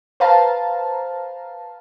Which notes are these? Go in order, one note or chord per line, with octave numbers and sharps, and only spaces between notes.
B4 C5 F5 A5 A#5